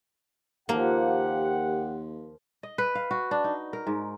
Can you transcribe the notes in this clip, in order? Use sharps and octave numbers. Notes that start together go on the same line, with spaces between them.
D#2 F3 A#3 G4 F#5
D#5
B4
F5
F#4
D4
D#4
A#4
G#2